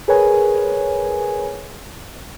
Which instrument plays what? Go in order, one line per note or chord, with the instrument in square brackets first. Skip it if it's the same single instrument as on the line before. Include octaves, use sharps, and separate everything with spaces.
[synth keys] G#4 A#4 B4 C#5 G#5